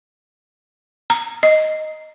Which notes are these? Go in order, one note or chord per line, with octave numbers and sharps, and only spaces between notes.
A#5
D#5